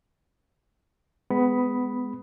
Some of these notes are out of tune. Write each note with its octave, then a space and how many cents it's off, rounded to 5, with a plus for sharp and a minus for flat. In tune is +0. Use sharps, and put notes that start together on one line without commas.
G#3 +0 B3 +20 B5 +0